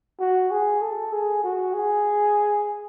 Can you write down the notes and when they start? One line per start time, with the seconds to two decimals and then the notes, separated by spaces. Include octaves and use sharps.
0.19 F#4
0.51 G#4
0.81 A4
1.12 G#4
1.43 F#4
1.74 G#4